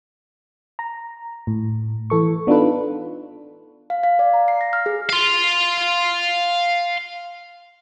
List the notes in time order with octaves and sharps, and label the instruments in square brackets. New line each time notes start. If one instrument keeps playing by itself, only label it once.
[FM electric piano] A#5
A2
E3 A4 C#6
B3 D4 D#4 F4 A4 B4
[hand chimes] F5
F5
D5
A#5
C7
A#6
F6
G#4
[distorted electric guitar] F5 C6